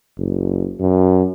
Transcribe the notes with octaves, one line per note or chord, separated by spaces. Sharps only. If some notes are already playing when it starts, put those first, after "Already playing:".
F#1
F#2